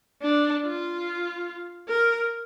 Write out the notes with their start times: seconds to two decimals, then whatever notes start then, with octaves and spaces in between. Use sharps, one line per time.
0.22 D4
0.65 F4
1.89 A#4